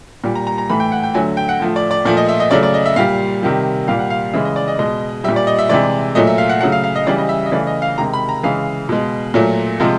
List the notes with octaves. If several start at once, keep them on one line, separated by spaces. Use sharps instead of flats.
A#2 G3
A#5
A#5
A#5
A2 E3 A3 B5
G5
F#5
G5
D3 F#3 A3 G#5
G5
F#5
A2 F3 A3
D5
D5
A#2 F3 A3 D5
D#5
E5
D#5
C#3 F#3 A3 D5
D5
D#5
E5
A#2 G3 F5
C3 D#3 G3
A#2 G3 F5
F#5
F5
C#3 E3 G#3 E5
D#5
D5
D#5
B2 G#3 D#5
A#2 G3 E5
D5
D#5
E5
C3 E3 G#3 D5
A#2 F#3 A3 D#5
E5
F5
F#5
C#3 F#3 A3 F#5
F5
F5
D#5
C#3 E3 G3 D5
D#5
E5
D#5
C#3 E3 A3 D5
D#5
F5
C3 D#3 G#3 A#5
B5
A#5
C#3 E3 G#3 F5
B2 G#3
A#2 F#3 A3
C3 F3 G#3